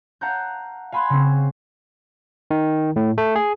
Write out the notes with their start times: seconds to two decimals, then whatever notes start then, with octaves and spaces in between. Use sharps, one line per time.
0.21 F5 F#5 A5 A#5 F#6 G6
0.92 F5 G#5 B5 C6 F#6 G#6
1.10 C#3 C4
2.51 D#3
2.96 A2
3.18 A3
3.36 G#4